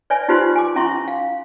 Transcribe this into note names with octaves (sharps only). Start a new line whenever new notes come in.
B4 C#5 D5 E5 G#5
D#4 F4 G4 B4 C5 C6
G#5 D6
C#4 E4 E5 C6 C#6
F5